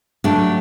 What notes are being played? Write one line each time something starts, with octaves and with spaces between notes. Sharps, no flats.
F#3 A3 D4 G4